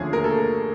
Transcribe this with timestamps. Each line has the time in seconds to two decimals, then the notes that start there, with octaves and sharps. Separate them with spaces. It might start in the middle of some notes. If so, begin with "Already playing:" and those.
Already playing: D#2 D3 F3 A3 C#4 G#4
0.13 A#4
0.24 A4